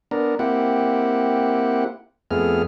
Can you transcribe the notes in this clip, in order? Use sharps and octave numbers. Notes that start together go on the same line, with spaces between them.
B3 D4 A#4
A#3 C4 E4 G4 F#5
F2 A3 B3 G#4 F6